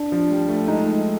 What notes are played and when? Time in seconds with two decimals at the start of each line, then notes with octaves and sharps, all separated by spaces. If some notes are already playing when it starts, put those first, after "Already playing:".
Already playing: D4
0.12 F3
0.30 G3
0.49 A3
0.68 G#3 D#4